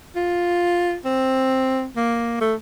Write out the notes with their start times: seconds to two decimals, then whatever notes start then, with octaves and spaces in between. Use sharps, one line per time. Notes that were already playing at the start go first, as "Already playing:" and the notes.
0.16 F4
1.05 C4
1.96 A#3
2.41 A3